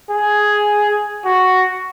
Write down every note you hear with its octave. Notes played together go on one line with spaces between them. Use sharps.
G#4
F#4